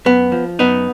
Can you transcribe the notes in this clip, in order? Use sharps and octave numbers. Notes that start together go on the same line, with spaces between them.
F#2 B3
F3
F#2 B3 D#4